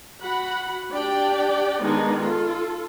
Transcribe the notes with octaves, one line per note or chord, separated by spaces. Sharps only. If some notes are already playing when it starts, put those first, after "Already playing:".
F#4 F#5 B5
D4 G4 D5 G5
D#3 G#3 B3 D4 D#4
F4 A4